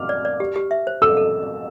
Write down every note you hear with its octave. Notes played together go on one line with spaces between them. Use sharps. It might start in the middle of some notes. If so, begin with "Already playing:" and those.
Already playing: D6 F6
D5
D5
G4
G4
E5
C5
A4 E6
A4